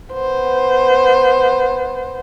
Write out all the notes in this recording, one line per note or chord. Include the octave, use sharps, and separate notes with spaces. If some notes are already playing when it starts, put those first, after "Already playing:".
B3 C5